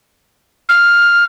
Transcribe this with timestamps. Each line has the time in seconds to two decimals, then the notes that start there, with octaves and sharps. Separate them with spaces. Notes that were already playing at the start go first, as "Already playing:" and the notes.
0.69 F6